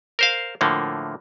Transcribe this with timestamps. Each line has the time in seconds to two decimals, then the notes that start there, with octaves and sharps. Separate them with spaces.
0.19 A#4 C5 F5
0.61 A2 D3 F3 A#3